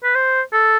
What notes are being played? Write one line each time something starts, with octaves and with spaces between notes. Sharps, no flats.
B4
C5
A4